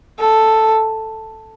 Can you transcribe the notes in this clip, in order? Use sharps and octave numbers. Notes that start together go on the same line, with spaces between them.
A4